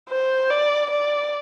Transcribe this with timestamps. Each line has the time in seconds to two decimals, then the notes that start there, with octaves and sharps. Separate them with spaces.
0.09 C5
0.50 D5
0.90 D5